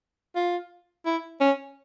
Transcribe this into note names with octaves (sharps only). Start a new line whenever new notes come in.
F4
E4
C#4